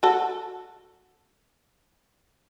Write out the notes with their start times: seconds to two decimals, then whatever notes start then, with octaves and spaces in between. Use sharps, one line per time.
0.03 F#4 A4